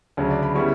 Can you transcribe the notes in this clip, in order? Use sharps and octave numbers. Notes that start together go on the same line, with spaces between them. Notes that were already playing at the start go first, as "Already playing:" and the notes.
D2 C#3 F#3
D5
B5
C#3 G3 B3 E4 C#6